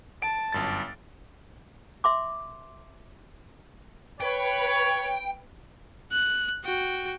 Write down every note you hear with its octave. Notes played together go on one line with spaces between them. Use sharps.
A5 D7
G1 F#2 A6
E5 C6 D6
B4 C#5 G5
F#6
F#4 G5